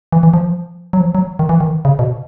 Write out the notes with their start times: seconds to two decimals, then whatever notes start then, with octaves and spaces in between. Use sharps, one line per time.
0.12 E3
0.23 E3
0.34 F3
0.93 F#3
1.00 F3
1.15 F#3
1.39 D#3
1.49 E3
1.60 D#3
1.85 C#3
1.99 B2